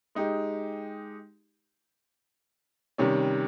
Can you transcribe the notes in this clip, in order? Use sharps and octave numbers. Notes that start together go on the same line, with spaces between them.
G#3 D#4 G4
C3 D#3 G3 C#4